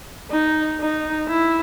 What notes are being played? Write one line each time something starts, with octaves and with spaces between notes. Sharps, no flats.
D#4
D#4
E4